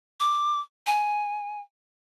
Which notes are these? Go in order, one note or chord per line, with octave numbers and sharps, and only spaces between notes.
D6
G#5